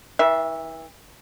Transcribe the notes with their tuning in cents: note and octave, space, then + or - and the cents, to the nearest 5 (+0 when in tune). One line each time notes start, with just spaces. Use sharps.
E3 -40 E5 +0